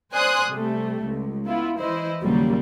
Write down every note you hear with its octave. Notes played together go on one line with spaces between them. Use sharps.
C5 D5 G#5 C6 D#6 F#6
C3 G3 A3
C#2
B3 E4 F4
E3 E4 C5 D#5
D#2 A#2 C#3 F#3 G3 A#3